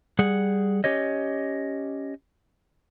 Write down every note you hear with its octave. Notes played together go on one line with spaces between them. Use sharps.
G3 G#4 F#5
C#4 G4 C#5 D#5